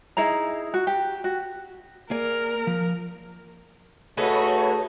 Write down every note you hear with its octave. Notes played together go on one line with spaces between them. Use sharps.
D#4 E4 G#4 A#5
F#4
G4
F#4
A#3 G#4 A#4 D5
F3
A3 D#4 F#4 G#4 A4 B4 C#5